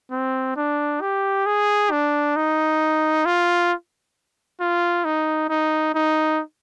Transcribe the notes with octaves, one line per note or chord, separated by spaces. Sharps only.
C4
D4
G4
G#4
D4
D#4
F4
F4
D#4
D#4
D#4